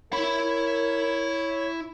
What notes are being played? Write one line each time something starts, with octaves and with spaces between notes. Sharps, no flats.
E4 A#4 C#5 B5